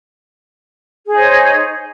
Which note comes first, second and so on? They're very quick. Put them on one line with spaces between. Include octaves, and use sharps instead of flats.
G#4 D#4 C5 C#5